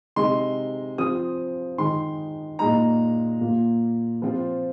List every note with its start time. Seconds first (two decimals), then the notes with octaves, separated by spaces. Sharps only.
0.16 C3 G#3 D#4 C6
0.98 F3 C4 F4 D#6
1.78 D#3 G#3 D#4 C6
2.59 A#2 G#3 D#4 A#5
3.41 A#2 A#3 F4
4.22 F3 C4 F4